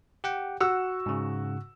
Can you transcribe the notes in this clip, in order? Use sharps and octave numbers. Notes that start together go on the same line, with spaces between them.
G4 F#5 G5
F#4 F#5 E6
G#2 C#3